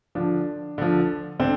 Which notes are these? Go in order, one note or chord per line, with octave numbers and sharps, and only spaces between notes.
D3 F3 D4
D3 F3
D3 C4